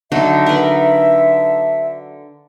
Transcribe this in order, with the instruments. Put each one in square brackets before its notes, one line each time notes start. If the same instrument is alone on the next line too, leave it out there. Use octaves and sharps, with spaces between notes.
[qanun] D3 F#3 D#4 [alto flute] E5
[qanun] A#4 B4